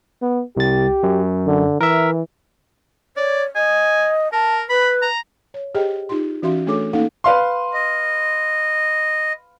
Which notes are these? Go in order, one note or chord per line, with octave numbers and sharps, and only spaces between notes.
B3
C2 G4 A6
F#2
D3
E3 A#4 E5
C#5 D5
D#5 G#5
A#4 A5
B4 B5
A#5
C#5
G4 G#4 C5 D#5 G5
D#4 F4 G4 C6
E3 C#4 F#4 E5 F5 C6
A3 D4 G#4 A4 C#5 D6
A#3 C#4 D#4 A4 F5 F#5
B4 F5 C6
D#5